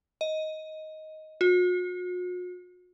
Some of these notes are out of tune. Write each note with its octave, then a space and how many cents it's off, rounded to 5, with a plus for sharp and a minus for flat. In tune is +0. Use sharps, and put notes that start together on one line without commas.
D#5 +10
F#4 -45